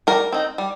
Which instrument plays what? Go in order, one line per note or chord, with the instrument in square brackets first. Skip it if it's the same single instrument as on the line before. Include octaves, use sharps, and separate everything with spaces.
[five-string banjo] G3 A#4
C4 D#4
G3